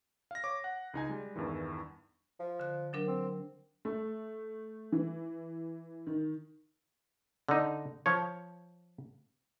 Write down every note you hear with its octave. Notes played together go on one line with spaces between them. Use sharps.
F5 A#6
C#5 D6
F#5
C#2 D#4 G#5
G3 G#3
E2 G2 D#3 E3
F3
D3 F#6
F#3 D4 A#4
C4
A3
E3
D#3
D3 D#4
F3 C#5